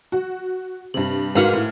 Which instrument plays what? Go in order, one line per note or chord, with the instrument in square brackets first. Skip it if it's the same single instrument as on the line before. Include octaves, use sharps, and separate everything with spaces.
[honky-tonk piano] F#4
[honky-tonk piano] G2 C3 [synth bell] F#7
[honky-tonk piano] G#2 F5 F6 [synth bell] F#4 A#4 B4
[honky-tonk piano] A2